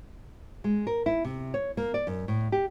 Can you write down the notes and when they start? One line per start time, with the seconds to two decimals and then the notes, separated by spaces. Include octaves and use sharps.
0.64 G#3
0.87 A#4
1.06 E4
1.25 C3
1.54 C#5
1.77 A#3
1.94 D5
2.07 F#2
2.28 A2
2.52 G4